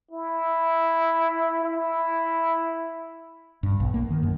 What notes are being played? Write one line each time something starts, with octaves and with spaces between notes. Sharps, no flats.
E4
E4
G2
B1
A#3
D#3
F#2